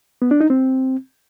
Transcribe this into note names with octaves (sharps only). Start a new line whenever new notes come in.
B3
D4
D#4
C4